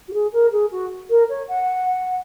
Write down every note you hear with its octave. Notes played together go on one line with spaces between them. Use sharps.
F#4
G#4
A#4
G#4
F#4
A#4
C#5
F#5